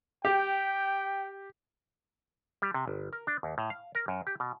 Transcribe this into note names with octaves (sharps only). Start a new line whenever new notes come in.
G4 G5
G3
C3
G1
A#4
D4
D#2
A2
F5
A#4
F#2
G4
B2